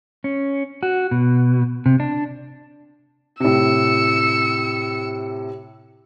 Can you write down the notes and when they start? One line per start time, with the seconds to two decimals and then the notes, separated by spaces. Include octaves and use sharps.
0.24 C#4
0.83 F#4
1.11 B2
1.86 C3
2.00 D4
3.40 A2 C3 E6 C#7